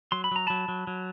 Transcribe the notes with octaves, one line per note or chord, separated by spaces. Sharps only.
F#3 C6
B5
F#3 A#5
F#3 A5 B5
F#3
F#3